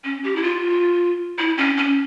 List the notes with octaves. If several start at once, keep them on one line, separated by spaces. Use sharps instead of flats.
C#4
G4
E4
F4
E4
C#4
C#4